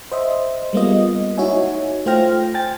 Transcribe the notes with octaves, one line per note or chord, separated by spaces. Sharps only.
C5 D#5 E5
G3 G#3 A#3 B3 F4 D#5
D#4 E4 F#4 C#5 E5 G#5
A3 F4 C5 G5 F6 A#6
G5 G#5 A6